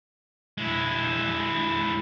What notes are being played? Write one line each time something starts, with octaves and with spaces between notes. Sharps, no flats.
G#3 E4